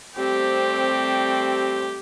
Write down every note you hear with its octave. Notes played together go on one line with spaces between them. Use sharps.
G3 A3 C4 G4